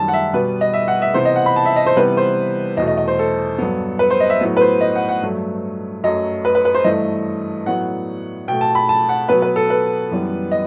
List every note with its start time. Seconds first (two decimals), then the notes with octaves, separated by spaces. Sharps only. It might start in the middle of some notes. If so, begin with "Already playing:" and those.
Already playing: F#2 D#3 G3 A5
0.08 F#5
0.13 E5
0.33 B2 G3 B3 B4
0.61 D#5
0.74 E5
0.88 F#5
1.02 E5
1.14 C3 E3 B3 C5
1.25 D#5
1.36 F#5
1.46 B5
1.56 A5
1.66 E5
1.76 D#5
1.86 C5
1.96 C3 E3 G3 B3 B4
2.17 C5
2.77 E2 B2 A3 D#5
2.87 D#5
2.97 D#5
3.08 C5
3.19 A4
3.59 G2 F#3 B3
3.99 B4
4.10 C5
4.20 D#5
4.30 E5
4.41 A2 F#3 B3
4.57 B4
4.61 C5
4.81 D#5
4.95 F#5
5.09 F#5
5.23 G2 F#3 A3
6.04 F#2 F#3 A3 D#5
6.45 B4
6.55 B4
6.65 B4
6.75 C5
6.84 G2 E3 A3 D#5
7.66 A2 F#3 B3 F#5
8.48 B2 A3 G5
8.61 A5
8.75 B5
8.89 A5
9.09 F#5
9.29 B2 F#3 B3 B4
9.42 B4
9.56 A4
9.70 B4
10.11 F#2 E3 G3 B3
10.51 D#5